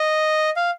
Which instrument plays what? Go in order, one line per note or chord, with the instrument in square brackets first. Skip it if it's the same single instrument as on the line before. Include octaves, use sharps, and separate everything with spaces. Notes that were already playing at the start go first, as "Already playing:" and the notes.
Already playing: [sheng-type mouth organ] D#5
F5